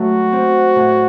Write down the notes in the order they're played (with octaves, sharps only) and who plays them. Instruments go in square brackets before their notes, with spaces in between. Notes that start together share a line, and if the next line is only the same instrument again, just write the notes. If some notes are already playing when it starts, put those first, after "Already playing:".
Already playing: [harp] F#3 A3 [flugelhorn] F#4
[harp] C4
A2